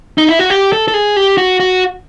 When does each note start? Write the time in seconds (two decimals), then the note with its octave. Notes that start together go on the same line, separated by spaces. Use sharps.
0.18 D#4
0.29 E4
0.39 F#4
0.50 G4
0.73 A4
0.88 A4
0.94 G#4
1.16 G4
1.38 F#4
1.60 F#4